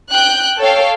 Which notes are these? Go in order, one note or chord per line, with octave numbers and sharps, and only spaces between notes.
G5 F#6 G6
A4 C#5 F5 G5